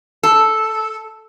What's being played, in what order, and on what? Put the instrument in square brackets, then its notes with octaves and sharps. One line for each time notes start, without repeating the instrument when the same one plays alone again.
[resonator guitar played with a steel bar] A4